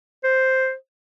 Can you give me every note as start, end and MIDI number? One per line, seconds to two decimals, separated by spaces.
0.24 0.74 72